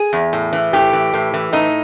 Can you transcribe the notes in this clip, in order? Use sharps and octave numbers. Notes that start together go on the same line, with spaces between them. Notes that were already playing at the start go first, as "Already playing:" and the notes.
Already playing: G#4
E2
A2
E3
A2 G4
E3
A2
E3
A2 D#4